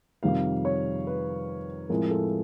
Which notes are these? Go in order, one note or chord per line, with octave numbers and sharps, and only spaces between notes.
F2 C3 D#3 G3 F5
C#5
B4
A2 F3 G#3 C4 A#4
A4